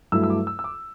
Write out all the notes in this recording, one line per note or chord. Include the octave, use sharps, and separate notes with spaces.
G2 F#3 A3 E4 E6
E6
D6
E6
E6
D6